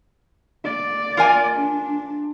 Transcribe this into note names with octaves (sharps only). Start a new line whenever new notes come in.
D5
F4 A#4 G#5
D4